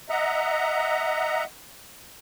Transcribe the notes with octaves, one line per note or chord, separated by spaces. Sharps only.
D#5 E5 F#5 A#5